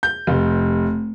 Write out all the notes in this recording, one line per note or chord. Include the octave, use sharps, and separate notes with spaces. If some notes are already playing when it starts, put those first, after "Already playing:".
G6
F1